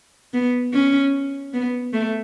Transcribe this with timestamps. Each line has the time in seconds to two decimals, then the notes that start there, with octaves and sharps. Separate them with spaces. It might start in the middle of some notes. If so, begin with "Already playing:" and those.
0.34 B3
0.73 C#4
1.53 B3
1.93 A3